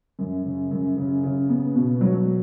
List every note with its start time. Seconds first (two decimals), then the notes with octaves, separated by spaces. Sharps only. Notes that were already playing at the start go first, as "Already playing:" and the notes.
0.19 F#2
0.44 C#3
0.71 F#2
0.97 C#3
1.23 C#3
1.49 B3
1.75 B2
2.01 F#3